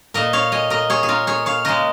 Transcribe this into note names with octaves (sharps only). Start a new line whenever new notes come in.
A#2 A#3 A#4 D#5
C#5 F5
D#5 G#5
A#4 D#5
G#4 C#5
G#4
F4 A#4
G#4 C#5
C#5 F5
C#3 G#3 A#4 D#5